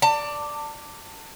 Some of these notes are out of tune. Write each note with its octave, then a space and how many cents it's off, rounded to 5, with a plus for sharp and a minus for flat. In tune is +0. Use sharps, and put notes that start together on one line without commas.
D5 +0 A5 +30